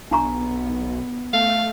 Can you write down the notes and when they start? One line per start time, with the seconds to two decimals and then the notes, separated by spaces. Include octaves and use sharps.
0.11 B1 B3 D4 A#5 C#6
1.33 A3 F5